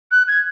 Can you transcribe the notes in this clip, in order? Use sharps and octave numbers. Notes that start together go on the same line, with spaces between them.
F#6
G#6